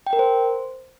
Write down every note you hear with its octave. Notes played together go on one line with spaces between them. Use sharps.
G5
A#4
C5